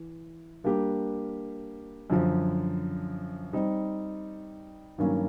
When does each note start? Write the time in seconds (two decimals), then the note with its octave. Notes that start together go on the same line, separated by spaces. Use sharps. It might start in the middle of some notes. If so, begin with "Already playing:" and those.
Already playing: E3
0.64 G3 A#3 D4 G4
2.10 F#2 D3 F3
3.53 G3 C4 D#4
4.98 G2 D#3 F#3 A#3 C#4